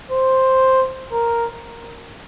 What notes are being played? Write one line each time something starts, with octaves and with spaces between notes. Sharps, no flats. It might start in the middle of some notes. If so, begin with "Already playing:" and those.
C5
A#4